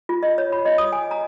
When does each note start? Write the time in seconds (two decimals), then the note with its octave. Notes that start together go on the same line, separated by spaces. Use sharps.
0.09 F4
0.23 D#5
0.38 C#5
0.52 B5
0.65 D#5
0.78 D#6
0.92 G#5
1.11 A#5